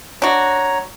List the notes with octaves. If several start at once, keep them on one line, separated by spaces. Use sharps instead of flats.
D4 F#4 C#5 A#5